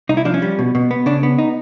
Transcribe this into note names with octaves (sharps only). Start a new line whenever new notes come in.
C2 D#4
E4
F3 D4
C#4
G3
B2
B2
B3
C#3 D4
B3
D#4